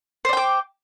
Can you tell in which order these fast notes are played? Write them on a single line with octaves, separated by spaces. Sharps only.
C5 D5 G5 D6